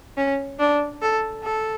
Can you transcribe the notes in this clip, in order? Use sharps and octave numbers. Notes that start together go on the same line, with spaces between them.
C#4
D4
A4
A4